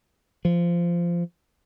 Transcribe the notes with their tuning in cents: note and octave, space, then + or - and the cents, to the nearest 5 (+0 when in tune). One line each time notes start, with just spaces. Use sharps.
F3 -15